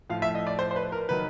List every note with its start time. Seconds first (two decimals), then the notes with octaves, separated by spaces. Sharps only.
0.10 A2 F3 F5
0.22 E5
0.35 D#5
0.47 D5
0.59 C5
0.71 C5
0.76 B4
0.92 A#4
1.09 D#3 F#3 B4